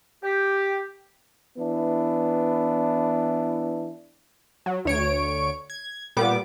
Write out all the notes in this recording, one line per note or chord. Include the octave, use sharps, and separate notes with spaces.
G4
E3 B3 D4 E4
F#3
D2 C#5 D7
G#6
A#2 G3 B3 D6